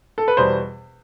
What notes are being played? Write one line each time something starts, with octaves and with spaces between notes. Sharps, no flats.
A4
B4
E2 B2 G3 C5